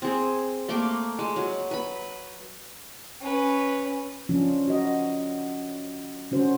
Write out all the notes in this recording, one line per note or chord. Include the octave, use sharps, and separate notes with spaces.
C4 G#4
A3 A#3 C6 D6
G#3
F#3
B4 B5
C#4 B4
F3 F#3 C#4 D4 F4
F#4 D#5
D3 C#4 F#4 C5